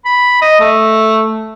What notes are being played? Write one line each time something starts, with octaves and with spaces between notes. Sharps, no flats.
B5
D#5
A3